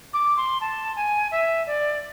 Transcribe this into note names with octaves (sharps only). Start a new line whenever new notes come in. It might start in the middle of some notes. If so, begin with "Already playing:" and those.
D6
C6
A5
G#5
E5
D5